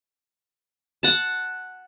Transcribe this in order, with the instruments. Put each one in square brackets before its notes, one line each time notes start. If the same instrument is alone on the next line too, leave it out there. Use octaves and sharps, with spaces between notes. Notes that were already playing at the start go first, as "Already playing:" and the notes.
[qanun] F#5 A5